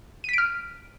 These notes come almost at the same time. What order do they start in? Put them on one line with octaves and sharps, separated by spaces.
D#7 B6 D7 F6